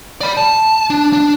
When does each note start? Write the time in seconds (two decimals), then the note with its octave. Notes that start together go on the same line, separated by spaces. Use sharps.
0.21 D5 B5
0.37 A5
0.90 D4
1.13 D4